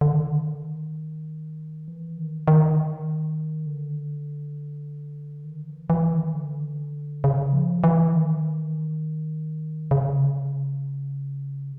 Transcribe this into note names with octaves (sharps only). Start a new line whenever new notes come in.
D3
D#3
E3
D#3
D#3
D3
D#3
E3
E3
D#3
D3
C#3
F3
E3
D#3
C#3